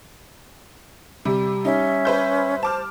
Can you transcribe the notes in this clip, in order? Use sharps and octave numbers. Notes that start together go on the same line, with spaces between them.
C3 G3
C#4 D#4 E5
B4 C5 G6
C5 A5 D6 F6